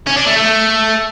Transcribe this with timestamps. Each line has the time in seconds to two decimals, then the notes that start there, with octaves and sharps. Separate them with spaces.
0.07 C#4
0.17 D4
0.27 A3
0.37 A3